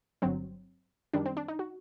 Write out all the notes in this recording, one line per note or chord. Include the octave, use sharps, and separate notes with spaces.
G1 G2 F#3 C4
F#2 D#3 G3 D4
C4
D4
D#4
F#4